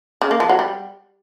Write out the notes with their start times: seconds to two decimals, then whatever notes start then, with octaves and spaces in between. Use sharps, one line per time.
0.22 C#3
0.31 A#3
0.40 F3
0.49 F#3
0.59 G3